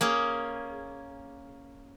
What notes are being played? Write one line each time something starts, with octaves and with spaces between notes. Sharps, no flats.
A#3 C#4 G#4